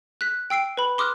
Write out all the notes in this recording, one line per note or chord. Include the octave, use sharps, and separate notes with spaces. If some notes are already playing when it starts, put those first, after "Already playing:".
F#6 B6
G5 E6 C7 D7
B4 B5
C6 D6 D#6 F6 F#6